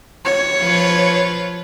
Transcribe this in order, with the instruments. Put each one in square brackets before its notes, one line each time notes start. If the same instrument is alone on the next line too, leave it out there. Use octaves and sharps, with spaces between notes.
[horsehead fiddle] C#5
[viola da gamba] F3 F4 B4